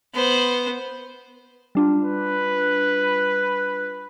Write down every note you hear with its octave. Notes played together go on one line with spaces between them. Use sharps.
B3 C5
G3 D4 F4
B4